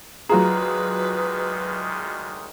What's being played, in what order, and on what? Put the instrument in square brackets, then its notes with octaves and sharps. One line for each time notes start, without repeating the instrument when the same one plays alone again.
[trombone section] D2 D#3 G#3 [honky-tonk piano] F#3 F4 G#4 [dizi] B4 [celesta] A#5